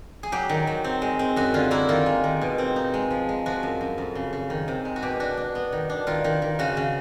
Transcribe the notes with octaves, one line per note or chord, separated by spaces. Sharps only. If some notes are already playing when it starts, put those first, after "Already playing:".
G#4
F#3 G4
D#3
F#3
C4
G#3
C4
F#2 F#4
D3 F4
A#3 E4
D#3 F4
G#3
D#3
B2
C4
D#4
G#3
F3
G#3
F3 F#4
F#2
F#2
F2
C#3
C#3
D#3
C3
G#3
F#4
B2 G4
D4 F#4
D4
B3
D#3
D4
D#3 F4
D#3
D#3
C#3 F#4
C#3